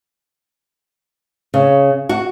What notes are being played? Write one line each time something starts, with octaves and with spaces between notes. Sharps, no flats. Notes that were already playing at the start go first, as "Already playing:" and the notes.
C#3
F#4